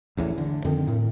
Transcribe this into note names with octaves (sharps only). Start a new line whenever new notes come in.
A1 E2 A2 E3
D3
F2 D3 D#3 C4
A2